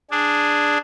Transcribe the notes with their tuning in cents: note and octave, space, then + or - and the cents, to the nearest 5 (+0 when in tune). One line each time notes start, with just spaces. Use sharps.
D4 +0 G#4 +0